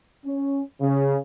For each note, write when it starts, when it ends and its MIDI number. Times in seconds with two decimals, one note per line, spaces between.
0.25 0.61 61
0.80 1.18 49